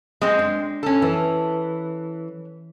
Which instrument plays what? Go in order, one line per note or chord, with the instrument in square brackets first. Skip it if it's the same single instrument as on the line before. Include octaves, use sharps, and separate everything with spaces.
[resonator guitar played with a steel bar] G#3 C4
[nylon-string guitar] D4
[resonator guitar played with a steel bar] C#4 A4
[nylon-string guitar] E3